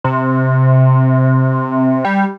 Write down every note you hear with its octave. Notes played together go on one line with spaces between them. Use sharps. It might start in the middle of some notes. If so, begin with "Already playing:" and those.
C3
G3